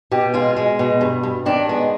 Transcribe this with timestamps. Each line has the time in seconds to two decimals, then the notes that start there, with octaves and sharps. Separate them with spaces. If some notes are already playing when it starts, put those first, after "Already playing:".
0.11 B2 G4
0.34 G#3 F4
0.56 G#3
0.79 B2
1.01 G2
1.23 G2
1.46 D#3 D4
1.69 G#3 B3